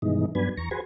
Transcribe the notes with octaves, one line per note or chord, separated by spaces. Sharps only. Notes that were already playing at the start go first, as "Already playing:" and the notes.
G2 B2 D#3 E3 G#3 D#4
G2 F#3 B3 D4 B4 G#5
E2 A#5 C#6
F#4 G#4 B4 C5 G#5